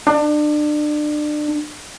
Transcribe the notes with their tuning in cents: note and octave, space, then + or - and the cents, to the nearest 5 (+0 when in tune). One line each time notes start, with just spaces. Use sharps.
D4 +30